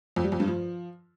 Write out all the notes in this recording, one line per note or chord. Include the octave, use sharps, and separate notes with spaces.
F2
G3
F2
G2
F3